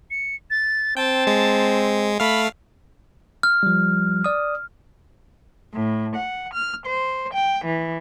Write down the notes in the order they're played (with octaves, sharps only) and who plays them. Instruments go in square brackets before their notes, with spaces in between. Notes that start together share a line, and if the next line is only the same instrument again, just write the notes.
[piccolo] C#7
A6
[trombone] C4 [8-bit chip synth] G5 [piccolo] A5
[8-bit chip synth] G#3
[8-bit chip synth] A3 F5 [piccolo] B5
[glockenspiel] F6
[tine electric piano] F3 G3
D5 D#6
[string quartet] A2
F#5
F6
C5
G5
E3